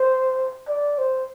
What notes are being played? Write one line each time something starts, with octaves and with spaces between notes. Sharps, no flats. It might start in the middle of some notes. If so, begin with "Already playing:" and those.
Already playing: C5
D5
C5